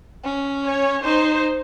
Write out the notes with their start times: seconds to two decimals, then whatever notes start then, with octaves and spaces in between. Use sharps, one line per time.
0.24 C#4
0.65 C#5
1.04 D#4 C5